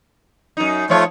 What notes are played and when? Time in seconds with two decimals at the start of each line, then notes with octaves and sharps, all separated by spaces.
0.57 F#2 D#4
0.90 F3 A3 F4 C#5